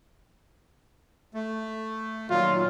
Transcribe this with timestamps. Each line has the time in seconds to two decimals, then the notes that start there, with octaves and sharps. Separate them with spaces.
1.34 A3
2.30 A#2 D#3 F#3 F4